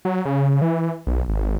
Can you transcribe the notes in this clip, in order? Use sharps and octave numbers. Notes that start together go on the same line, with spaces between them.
F#3
C#3
E3
B1
G#1